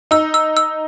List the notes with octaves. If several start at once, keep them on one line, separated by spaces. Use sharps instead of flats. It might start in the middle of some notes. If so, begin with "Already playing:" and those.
D#4 E6
E6
E6